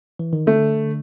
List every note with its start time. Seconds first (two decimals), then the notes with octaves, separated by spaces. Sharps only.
0.19 E3
0.33 D#3
0.47 D3 A3